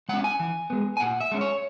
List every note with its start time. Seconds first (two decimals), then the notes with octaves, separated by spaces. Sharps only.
0.09 G#3 C#4 F#5
0.24 G#5
0.40 E3
0.70 G#3 B3
0.97 G#5
1.00 A#2 F#5
1.20 E5
1.31 G#3 C#4
1.41 C#5